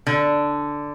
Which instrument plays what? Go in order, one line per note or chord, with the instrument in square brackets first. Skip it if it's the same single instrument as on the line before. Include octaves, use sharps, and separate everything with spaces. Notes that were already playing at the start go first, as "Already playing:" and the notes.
[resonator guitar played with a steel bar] D3